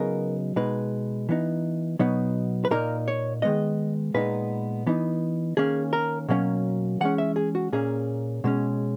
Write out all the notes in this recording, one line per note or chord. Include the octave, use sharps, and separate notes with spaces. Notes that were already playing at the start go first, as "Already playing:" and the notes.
Already playing: C#3 F#3 B3 D#4 A#4
B2 G#3 D#4 B4
E3 B3 D#4
B2 F#3 B3 D#4
B4
A#2 A#3 D#4 A#4
C#5
D#3 G#3 B3 D#5
A#2 G#3 B3 D#4 B4
E3 B3 D#4
D#3 A#3 C#4 G#4
A#4
B2 F#3 A#3 C#4
E3 G#3 C#4 F#5
E5
G#4
F#4
A#2 A#3 C#4 G#4
B2 G#3 C#4